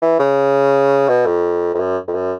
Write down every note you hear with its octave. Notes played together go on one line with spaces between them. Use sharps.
E3
C#3
B2
F2
F2
F#2
F2
F#2